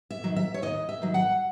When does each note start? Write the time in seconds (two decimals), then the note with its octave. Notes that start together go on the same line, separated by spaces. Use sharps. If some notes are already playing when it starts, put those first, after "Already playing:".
0.11 E5
0.24 D#3 F#3
0.36 E5
0.54 C#5
0.62 D#2 D#5
0.89 E5
1.02 D#3 F#3
1.14 F#5